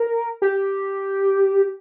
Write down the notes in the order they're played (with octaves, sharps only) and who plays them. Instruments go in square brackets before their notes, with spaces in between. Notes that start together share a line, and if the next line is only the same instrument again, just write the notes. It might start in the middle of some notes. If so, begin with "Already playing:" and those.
Already playing: [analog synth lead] A#4
G4